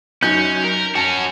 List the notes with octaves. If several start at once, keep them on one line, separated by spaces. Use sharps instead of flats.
F#2 C#4 D#4 G6
A#4
C#4 F#4 A5